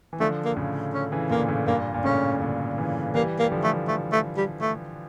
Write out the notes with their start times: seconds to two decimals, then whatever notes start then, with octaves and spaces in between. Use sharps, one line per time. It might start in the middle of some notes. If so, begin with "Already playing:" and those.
0.13 E3
0.20 D3 F3 A3
0.45 A#3
0.56 A2 C#3
0.94 C#4
1.12 C#3 E3
1.30 A#2 D3 A#3
1.48 A2 C#3
1.67 G2 A#2 A#3
1.94 A#2
2.04 A2 C#3 C#4
2.41 A#2 D3
2.78 C#3 E3
3.14 E3 G3 A#3
3.39 A#3
3.44 G3
3.52 D3 F3
3.64 A3
3.88 A3
4.12 A3
4.37 G3
4.61 A3